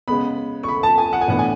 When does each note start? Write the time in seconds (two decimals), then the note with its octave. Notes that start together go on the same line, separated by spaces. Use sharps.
0.08 C#3 G#3 B3 B5
0.63 C#6
0.68 B5
0.83 A5
0.98 G#5
1.13 F#5
1.21 G#5
1.28 A2 E3 B3 D4 F#5
1.39 G#5